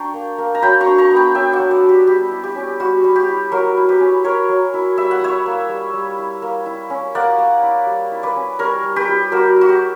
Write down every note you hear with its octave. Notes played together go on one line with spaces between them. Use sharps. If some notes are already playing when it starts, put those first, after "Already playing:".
Already playing: D4 G5 A#5 C#6
A#3
A#3
A#5
F#3 G5 B5
A#5 C#6
D4
A#5 C#6
B3
G5 B5
F#3 E5 G5
D5 F#5
F#3
D5 F#5
D4
G4
G3 G4
E4
G4
C#4
G3 F#4
G3
G4
E4
F#3 F#4 A#4
E4
G4 B4
C#4
F#3 A#4 C#5
F#3
E4
G3 E5
F#5
E4 C#5 E5
A#3
G3
G3
E4
A#3
E4
C#4
A#3 D5 F#5
A#3
E4
G3
E4
B4 D5
C#4
G3 A#4 C#5
G3
G4 B4
E4
G3 F#4 A#4
E4 F#4
G4